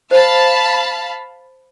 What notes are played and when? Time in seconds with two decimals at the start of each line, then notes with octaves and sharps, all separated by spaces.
0.11 C5 F5 A5 B5